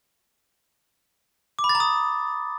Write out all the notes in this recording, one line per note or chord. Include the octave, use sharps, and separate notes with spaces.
D6
B5
A6
A#5
D#6